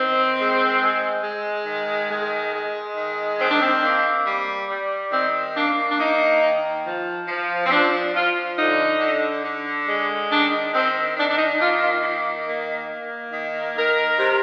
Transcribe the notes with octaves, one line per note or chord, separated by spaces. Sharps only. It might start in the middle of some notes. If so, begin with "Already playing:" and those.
Already playing: D#3 C4
G#3
G#3
G#3
D#3
G#3
G#3
D#3
D#3 C4
D4
C4
A#3
G3
G3
D#3 C4
A#3 D4
D4
A#3 D#4
D#3
F3
F3
C4
F3 D4
F3 F4
D3 D#4
D3
D3
G#3
D#3 D4
D#3 C4
D#3 D4
D4
D#4
A#3 F4
F4
D#3
A#3
A#3
D#3
D#3 A#4
C3